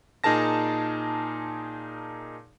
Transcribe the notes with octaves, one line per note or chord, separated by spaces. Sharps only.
A#2 D#4 G#4 A#4 A5 A#6